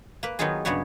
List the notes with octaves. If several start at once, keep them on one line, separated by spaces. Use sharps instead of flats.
A#3 B4
D#3 F#3 B3 D#4 F4 G#4
G2 C#3 F#3 B3 C#5